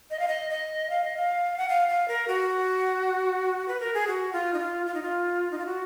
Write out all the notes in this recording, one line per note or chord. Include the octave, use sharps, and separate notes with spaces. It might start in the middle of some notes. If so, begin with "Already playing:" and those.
D#5
F5
D#5
D#5
F5
D#5
F5
F#5
F5
F5
A#4
F#4
B4
A#4
G#4
F#4
F4
D#4
F4
F4
D#4
F4
D#4
F4
F#4